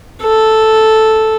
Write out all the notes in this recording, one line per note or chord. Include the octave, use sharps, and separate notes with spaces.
A4